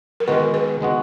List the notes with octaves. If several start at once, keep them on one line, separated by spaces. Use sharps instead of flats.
A#4
D#3 G#3 B3 F#4 B4
B4
D#3 G#3 B3 F#4